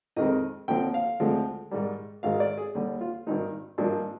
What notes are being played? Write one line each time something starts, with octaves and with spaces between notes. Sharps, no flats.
F2 D#3 G#3 C4 D#5
D#2 D3 F3 C4 G5
F5
D2 D3 F3 G#3 C4
G#2 D#3 G3
G#1 G#2 D#3 G#3 F5
D5
G#4
D#2 D3 G3
F4
G#1 G2 D#3 D#4
G#1 G2 F3 A#3 D4